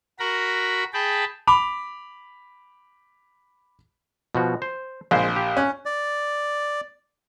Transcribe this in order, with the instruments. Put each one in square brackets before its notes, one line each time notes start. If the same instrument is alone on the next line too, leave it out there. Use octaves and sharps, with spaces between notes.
[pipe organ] F#4 A#4 A#5 B5
G#4 G5 A5 B5
[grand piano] B5 D6 F7
[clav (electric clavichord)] B2 F3 F#4
C5
[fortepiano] A#1 [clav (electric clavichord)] G#3 C5
[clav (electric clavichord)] G4
[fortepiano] C#4 F#6
[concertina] D5